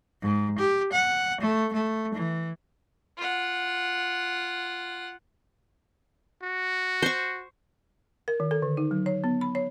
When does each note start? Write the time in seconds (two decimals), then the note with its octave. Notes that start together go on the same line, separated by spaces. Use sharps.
0.22 G#2
0.58 G4
0.92 F#5
1.41 A3
1.73 A3
2.14 E3
3.17 F4 F#5
6.42 F#4
7.02 C5 C#6
8.28 A#4
8.40 D#3
8.51 A4
8.62 D3
8.77 D#4
8.91 F#3
9.06 C#5
9.24 B3
9.41 B5
9.55 C#5